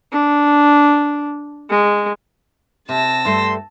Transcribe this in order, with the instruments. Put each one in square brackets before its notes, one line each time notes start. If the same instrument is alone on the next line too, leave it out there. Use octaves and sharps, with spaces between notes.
[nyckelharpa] D4
G#3
[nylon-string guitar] C3 [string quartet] A5 E6 A#6
[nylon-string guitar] G2 A3 [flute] C6